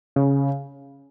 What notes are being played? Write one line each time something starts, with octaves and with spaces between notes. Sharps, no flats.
C#3